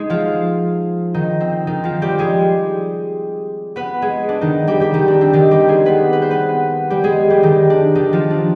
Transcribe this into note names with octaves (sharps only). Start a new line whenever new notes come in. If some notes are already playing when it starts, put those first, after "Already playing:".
Already playing: G#3 D#4 G#4
F3 F4
D#3 D#4
C4
D#3 D#4
F3 F4
G3 G4
G#3 G#4
B3 B4
G#3 G#4
D4
D#3 D#4
G3 G4
G3 G4
D#3 D#4
D4
C4
D#3 D#4
G3 G4
G#3 G#4
B3 B4
B4
C5
B3 B4
G3 G4
G#3 G#4
G3 G4
D#3 D#4
D4
D#3 D#4
F3 F4
D4